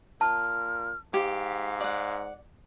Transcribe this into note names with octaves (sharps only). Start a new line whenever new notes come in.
A#2 A5 F6
G#2 G4 F5
D5 F#5